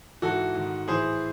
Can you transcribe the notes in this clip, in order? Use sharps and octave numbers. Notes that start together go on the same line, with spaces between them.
G#2 E3 F#4 A4
G#2 D#3
A2 E3 G#4 C5